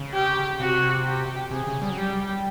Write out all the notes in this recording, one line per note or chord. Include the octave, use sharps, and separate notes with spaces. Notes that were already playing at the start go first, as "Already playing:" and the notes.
Already playing: C#3
G4
C3 F#4
G4
C3 G#4
C#3
G3
F#3
G3 G4